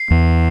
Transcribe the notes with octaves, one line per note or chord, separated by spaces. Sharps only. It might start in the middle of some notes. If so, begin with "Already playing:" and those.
Already playing: C7
E2